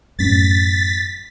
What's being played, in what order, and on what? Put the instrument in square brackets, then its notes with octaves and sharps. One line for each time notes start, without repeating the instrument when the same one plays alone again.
[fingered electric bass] F#2 A2 C#4 [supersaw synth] A6 B6